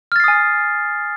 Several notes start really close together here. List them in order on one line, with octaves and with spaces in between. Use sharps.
F6 A6 C7 D#6 G#5